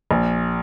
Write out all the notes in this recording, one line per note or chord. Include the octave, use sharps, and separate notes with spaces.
A#1